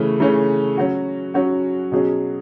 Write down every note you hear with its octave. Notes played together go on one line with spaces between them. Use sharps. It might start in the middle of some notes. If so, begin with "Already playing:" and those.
Already playing: C#3 E3 A3 C#4
C#3 E3 A3 C#4
F#3 C#4 F#4
F#3 C#4 F#4
B2 F#3 C#4 G#4